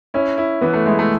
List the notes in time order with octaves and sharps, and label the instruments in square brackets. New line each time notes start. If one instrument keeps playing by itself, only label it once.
[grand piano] C#4 [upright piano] E4
[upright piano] E4
[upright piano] E3 [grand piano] B3
[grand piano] A3
[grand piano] G#3 [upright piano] E4
[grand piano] A3